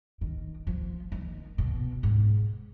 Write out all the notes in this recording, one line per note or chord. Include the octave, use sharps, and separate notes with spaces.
D#3
F3
D#3
B2
G#2